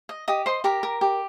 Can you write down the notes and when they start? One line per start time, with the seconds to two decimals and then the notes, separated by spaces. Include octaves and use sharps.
0.09 D#5
0.28 G4 D#5 D#6
0.46 C5 D#5 C6
0.64 G4 A#4 A#5
0.83 A#4
1.01 G4